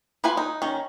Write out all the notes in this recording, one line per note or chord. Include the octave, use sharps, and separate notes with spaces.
E4 F4 B4 G#5 B5
D#4
D#3 C#4